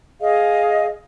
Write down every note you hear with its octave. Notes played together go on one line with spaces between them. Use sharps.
G#4 D#5 F5